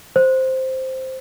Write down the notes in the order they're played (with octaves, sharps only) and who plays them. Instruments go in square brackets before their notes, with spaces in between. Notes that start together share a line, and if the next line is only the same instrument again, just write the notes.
[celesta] C5